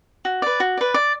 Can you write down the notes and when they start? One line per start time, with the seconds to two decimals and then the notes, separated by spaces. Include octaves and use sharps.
0.25 F#4
0.42 B4 D5
0.60 F#4
0.77 B4 D5
0.94 D5